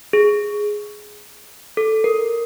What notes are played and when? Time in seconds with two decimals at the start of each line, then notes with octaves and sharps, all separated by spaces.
0.13 G#4
1.77 A4
2.04 A#4